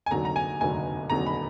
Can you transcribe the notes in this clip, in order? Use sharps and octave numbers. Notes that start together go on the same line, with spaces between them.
G#5
F1 D#2 D3 F#3 A#5
A#5
G#5
F1 D#2 D3 F#3 G#5
F1 D#2 D3 F#3 A#5
B5